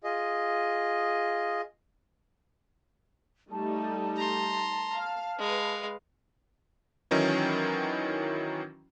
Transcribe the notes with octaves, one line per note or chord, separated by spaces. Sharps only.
F4 G#4 D#5
G3 A3 D#4 A5
A#5 C6
F5
G#3 B4 F5
D#3 E3 F#3 C#4 D#4 E4